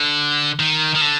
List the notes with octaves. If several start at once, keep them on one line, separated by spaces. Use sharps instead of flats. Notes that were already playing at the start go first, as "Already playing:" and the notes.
Already playing: D3
D#3
D#3
D3